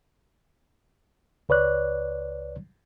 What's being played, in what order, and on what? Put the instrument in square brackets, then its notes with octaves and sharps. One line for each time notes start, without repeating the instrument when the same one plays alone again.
[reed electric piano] C#2 B4 C#5 D5 F#6